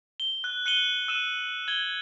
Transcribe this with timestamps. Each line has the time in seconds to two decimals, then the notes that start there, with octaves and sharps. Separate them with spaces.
0.20 G7
0.44 F#6
0.66 F#6 C#7 D#7 F#7 G7
1.08 E6 D#7 E7
1.68 G#6 F#7 G7